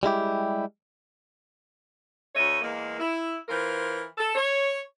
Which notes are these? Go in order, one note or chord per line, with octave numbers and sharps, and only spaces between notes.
G3 G#3 E4 G4
D2 A3 C#5 D#5
E2 G#3 A#3
E4
E3 F4 A#4 C5
A4
C#5